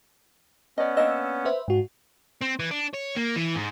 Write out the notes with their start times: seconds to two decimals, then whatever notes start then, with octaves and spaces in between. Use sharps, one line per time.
0.78 B3 C#4 D5 D#5
0.97 A#3 D4 D#5 E6
1.45 B4 C5 E5
1.68 G#2 F#4
2.41 C4
2.59 E3
2.71 D4
2.94 C#5
3.16 A#3
3.36 E3
3.55 G#2